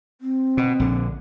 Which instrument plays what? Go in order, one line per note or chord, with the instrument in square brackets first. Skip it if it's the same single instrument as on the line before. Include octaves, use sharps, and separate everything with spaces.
[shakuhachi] C4
[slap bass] B2
A#1 D3